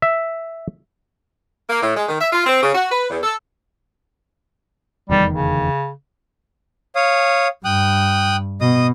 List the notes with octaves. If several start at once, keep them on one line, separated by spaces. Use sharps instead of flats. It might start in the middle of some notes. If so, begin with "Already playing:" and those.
E5
A#3
A2
G#3
D#3
E5
F4
C4
C#3
F#4
B4
E2
A4
F1 E2 D#3 G3
C#3
C#5 F5 D#6
G2 G5 D#6 F#6
B2 D#5 D#6